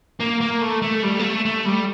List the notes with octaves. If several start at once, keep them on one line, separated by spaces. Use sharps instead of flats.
A#3
A#3
A3
A3
G3
A#3
A3
A3
G3